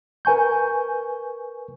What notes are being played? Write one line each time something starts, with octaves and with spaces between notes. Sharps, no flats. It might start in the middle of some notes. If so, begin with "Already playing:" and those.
A#4 B4 G#5 C#6 G6